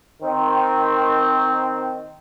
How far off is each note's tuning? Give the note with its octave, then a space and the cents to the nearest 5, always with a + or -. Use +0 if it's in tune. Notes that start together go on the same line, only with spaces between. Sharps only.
D#3 +0 C4 -5